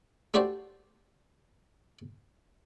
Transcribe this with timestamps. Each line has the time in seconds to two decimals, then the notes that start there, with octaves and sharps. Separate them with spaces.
0.34 A3 D4 F#4 G4 C5 D5